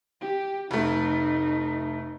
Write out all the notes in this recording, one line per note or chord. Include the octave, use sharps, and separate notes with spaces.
G4
F1 A3 D#4